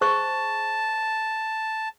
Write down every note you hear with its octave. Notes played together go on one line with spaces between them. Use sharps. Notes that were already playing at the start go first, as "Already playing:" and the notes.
G#4 C5 A5 C#6